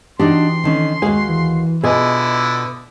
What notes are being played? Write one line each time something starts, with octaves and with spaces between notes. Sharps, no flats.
E3 D4 D#4 F#4 G4 D5 C6
D3 D#3 C#4
D#2 G#3 F#4 G#4 F5 G#5
E3
B2 D3 E4 F4 G#4 D#5 G#5 D#6